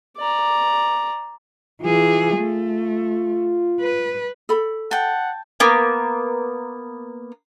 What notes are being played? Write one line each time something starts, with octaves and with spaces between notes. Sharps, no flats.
D5 A#5
E3 F4 G#4
A3
B4
A4 B5
F#5 G5 A5
A#3 B3